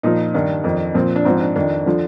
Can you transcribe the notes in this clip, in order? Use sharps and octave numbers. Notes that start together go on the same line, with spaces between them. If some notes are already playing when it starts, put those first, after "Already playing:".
A#2 F3 D#4
G2 D#3 D4
F2 D#3
A#2 F3 C4
D4
G#2 F3 C4
D4
F2 D#3 D4
D3 F3